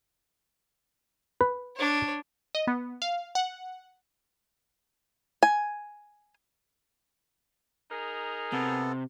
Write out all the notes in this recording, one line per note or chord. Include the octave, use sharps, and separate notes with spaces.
B4
D4 C#5
D#5
B3
F5
F#5
G#5
D#4 G#4 A#4
C3 B3 A4